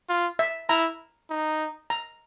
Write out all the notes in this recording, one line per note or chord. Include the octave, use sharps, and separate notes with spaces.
F4
E5
E4 A#5
D#4
A#5